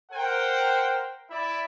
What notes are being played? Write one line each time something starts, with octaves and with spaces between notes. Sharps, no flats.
A#4 C5 F#5 G5
E4 D5 E5